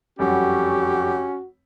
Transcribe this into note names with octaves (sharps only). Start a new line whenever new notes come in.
F1 F#2 G3 C#4 F#4 G4